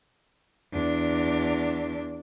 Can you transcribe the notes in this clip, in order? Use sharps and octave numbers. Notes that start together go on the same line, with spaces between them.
E2 D4